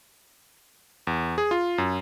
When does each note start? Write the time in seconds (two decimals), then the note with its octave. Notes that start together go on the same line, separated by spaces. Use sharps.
1.07 E2
1.38 G#4
1.51 F4
1.78 F#2